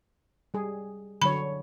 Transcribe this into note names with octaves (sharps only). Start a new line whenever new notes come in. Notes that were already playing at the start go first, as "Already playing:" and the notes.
G3 G#4
D3 F#3 C#5 B5